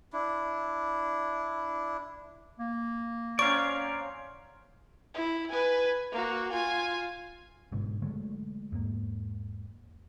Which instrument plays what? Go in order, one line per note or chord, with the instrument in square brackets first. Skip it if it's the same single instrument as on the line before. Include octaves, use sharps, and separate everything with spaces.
[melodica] D4 E4
[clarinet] A#3
[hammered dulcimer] F#3 C4 C#4 [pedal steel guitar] D5 F5 [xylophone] C#6
[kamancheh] E4
B4 G#5
A#3 F#4
F4 G#5
[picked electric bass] G1 G#2 B2 D3
D3 F#3 G#3 A3
E2 G#2 A#3